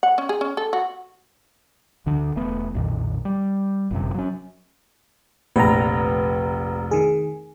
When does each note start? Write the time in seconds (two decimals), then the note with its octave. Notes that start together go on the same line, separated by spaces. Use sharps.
0.03 F#5
0.18 C#4
0.29 G#4
0.41 C#4
0.57 A4
0.73 F#4
2.06 D2 D3
2.36 E1 A3 B3
2.75 B1 F2 A#2 D#3
3.25 G3
3.91 G1 F#2 C3
4.14 F#3 C#4
5.56 F1 A#1 B4 A#5
6.91 D#3 G#4